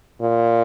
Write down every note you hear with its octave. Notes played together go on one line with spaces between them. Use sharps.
A#2